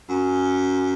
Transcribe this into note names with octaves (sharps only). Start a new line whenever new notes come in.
F#2